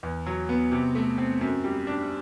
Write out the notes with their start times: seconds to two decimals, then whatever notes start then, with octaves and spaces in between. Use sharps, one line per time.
0.03 E2
0.26 F#3
0.49 B3
0.72 C3
0.95 A3
1.18 C4
1.41 F#2
1.64 G3
1.87 D4